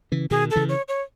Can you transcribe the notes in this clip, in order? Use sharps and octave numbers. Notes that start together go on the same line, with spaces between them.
C#3 E3
B2 D#3 G#4
A4
C#3 E3
C#5
C#5